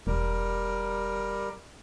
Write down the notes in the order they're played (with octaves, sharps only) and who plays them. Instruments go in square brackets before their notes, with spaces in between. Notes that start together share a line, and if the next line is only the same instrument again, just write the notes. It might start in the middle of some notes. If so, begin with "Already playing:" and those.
[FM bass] E1 [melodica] G3 A#4